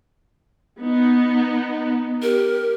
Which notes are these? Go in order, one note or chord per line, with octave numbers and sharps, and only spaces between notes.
B3 D#4
G4 A#4